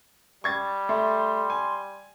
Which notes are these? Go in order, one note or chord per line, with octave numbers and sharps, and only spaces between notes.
G3 C#6 G#6 A6
A3 C6
G#5